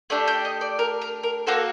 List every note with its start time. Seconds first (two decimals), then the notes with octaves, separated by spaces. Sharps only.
0.10 A3 D4 G4 D5
0.28 G5
0.45 D#5
0.61 D5
0.79 A#4
1.01 A#4
1.23 A#4
1.47 A#3 F#4 A4 C5